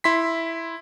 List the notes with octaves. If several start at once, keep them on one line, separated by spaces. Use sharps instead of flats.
E4 C6 B6